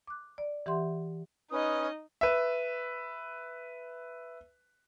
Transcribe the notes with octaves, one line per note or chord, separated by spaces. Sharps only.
D6 F#6
D5
E3 G4 E5 F#5 C6
C#4 D#4 B4 D#5 D#6
B4 E5